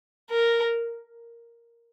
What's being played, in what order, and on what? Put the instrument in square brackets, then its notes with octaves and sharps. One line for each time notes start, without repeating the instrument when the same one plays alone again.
[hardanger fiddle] A#4